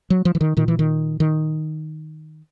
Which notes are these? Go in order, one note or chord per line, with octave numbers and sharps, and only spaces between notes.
F#3
F3
E3
D#3
A#2 D#3
E3
D#3
D#3